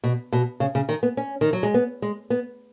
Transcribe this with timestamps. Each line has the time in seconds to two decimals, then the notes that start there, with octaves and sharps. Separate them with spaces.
0.04 B2
0.33 B2
0.60 C#3
0.75 C#3
0.89 D#3
1.03 B3
1.17 C#4
1.41 D#3
1.53 F#3
1.63 G#3
1.74 B3
2.02 G#3
2.30 B3